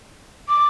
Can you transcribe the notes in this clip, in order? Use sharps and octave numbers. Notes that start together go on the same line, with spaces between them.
D6